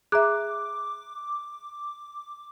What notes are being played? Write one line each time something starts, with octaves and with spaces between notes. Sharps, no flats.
G#4 E5 A#5 D6 F#6